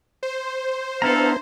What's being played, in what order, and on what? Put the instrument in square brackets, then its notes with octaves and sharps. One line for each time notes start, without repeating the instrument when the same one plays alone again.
[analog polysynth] C5
[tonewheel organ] B3 [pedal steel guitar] D4 E4 A#5 [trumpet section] A4 F5